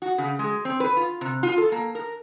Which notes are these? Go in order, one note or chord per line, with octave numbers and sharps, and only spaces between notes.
F#4
C#3
G#3
C4
B4
F4
C3
F4
A4
A#3
A#4